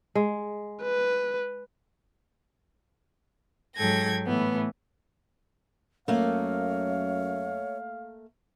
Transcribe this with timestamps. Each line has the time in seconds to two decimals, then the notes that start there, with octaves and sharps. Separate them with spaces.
0.15 G#3
0.83 B4
3.76 G#2 F#3 A4 G5 G#6 A#6
4.27 A2 E3 B3
6.08 F#2 A3 A#3 C#5 F5